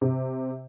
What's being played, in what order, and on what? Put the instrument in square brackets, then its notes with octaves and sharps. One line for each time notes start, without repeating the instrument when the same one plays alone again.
[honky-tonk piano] C3